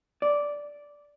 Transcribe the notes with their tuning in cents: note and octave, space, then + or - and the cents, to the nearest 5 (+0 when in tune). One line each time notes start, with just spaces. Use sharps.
D5 -10